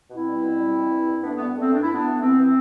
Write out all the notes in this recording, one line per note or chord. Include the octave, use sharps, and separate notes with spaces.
B2 C4 E4
G3
B2
G3
E3
G2
G2
A3 B3 D4
G2 B3
A3 C4
G2 D4
E4
G2
B3 D4
A3
E3 C4
E3